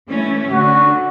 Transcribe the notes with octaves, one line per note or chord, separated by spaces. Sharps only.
E3 A3 C#4
D3 F#4